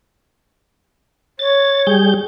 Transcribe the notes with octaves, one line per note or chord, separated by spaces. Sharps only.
C#5 A6
G3 G#4 G6